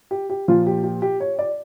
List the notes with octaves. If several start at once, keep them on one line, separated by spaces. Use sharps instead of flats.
G4
G4
A#2 F3 F4
G4
G4
G4
C#5
D5